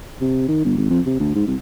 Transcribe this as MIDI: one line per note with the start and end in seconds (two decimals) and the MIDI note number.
0.21 0.48 48
0.48 0.61 51
0.65 0.74 31
0.78 0.90 32
0.90 1.00 41
1.06 1.19 48
1.20 1.33 38
1.35 1.44 44
1.47 1.55 36